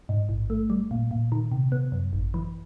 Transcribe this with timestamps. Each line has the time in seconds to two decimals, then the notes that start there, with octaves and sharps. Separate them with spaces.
0.09 G#2
0.29 A1
0.50 A3
0.70 G3
0.91 A#2
1.11 A#2
1.32 D#3
1.52 C3
1.72 B3
1.92 F#2
2.13 G#1
2.34 E3